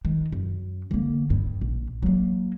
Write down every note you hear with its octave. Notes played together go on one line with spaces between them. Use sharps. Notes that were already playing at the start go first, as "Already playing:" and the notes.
D#3
F#2
D3 A#3
G2
A#1
F#3 A#3